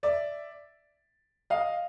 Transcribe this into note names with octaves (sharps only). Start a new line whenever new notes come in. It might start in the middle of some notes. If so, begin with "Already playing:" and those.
D5 E5
D#5 F5